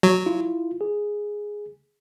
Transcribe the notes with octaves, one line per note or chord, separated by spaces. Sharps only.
F#3
E4 F4
G#4